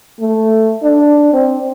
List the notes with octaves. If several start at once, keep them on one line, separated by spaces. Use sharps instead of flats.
A3
D4
C4